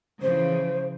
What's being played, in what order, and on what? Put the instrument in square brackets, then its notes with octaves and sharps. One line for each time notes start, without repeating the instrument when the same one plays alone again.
[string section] C#3 E3 F3 [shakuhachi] C5